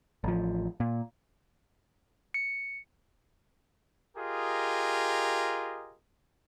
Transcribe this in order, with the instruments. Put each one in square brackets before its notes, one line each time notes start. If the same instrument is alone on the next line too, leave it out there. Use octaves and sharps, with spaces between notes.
[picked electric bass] A1 F3
A#2
[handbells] C#7
[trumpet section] F4 G4 G#4 A#4 D#5